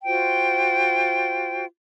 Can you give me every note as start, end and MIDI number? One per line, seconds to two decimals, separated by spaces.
0.05 1.65 65
0.05 1.65 66
0.05 1.65 72
0.05 1.65 79